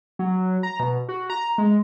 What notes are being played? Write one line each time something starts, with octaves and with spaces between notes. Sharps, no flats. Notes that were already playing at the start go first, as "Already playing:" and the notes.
F#3
A#5
B2
F#4
A#5
G#3